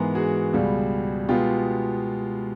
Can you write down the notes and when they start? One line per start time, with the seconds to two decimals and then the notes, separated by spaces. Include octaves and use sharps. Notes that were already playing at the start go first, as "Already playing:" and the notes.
Already playing: G#2 E3 G#3 B3 G#4 A#4
0.15 F#4 G#4
0.53 C#2 B2 G3
1.28 B2 G#3 B3 F4 G4